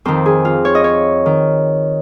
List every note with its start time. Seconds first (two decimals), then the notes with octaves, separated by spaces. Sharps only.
0.05 F2 D#3 C5
0.26 G#4
0.45 F4
0.65 C#5
0.75 D#5
0.84 C#5
1.26 D#3